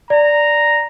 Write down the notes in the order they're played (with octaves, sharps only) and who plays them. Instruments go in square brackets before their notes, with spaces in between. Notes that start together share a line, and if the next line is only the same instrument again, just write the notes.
[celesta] D5 [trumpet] A#5